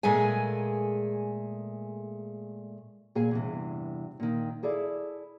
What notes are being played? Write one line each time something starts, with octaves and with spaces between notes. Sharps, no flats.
A#2 G#3 A3 G#4 G#5
A#2 G#4 G#5
E2 G2 C3
A#2 D#3
E4 G#4 A4 D5 E5